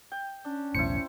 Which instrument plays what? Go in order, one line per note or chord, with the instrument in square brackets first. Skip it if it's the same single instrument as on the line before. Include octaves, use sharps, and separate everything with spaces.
[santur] G5
[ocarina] C#4 [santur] D4
[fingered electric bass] B1 E2 A2 [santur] E4 C5 [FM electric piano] C#7